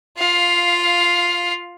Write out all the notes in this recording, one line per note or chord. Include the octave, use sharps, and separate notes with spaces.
F4 F5